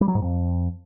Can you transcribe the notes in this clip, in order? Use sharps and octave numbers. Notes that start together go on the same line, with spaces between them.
G3
F#3
G#2
F2